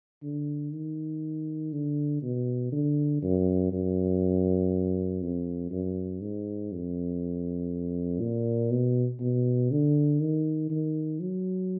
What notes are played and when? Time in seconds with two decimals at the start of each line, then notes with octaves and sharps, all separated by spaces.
0.23 D3
0.73 D#3
1.72 D3
2.23 B2
2.72 D3
3.23 F#2
3.73 F#2
5.22 F2
5.71 F#2
6.21 G#2
6.72 F2
8.21 A#2
8.71 B2
9.20 B2
9.71 D3
10.20 D#3
10.70 D#3
11.20 F#3